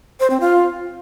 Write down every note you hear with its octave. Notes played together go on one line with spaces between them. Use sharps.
C5
C4
F4